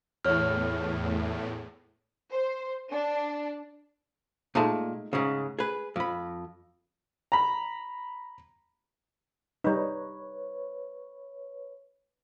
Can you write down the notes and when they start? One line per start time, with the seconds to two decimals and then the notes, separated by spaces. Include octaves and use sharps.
0.25 E2 A2 C#5 F6
2.31 C5
2.91 D4
4.55 A#2 G#3 A3 D#4 A5
5.13 G#2 C#3
5.59 G#4 B4
5.96 F2 B5
7.32 A#5 B5
9.64 G3 D#4 B4 C#5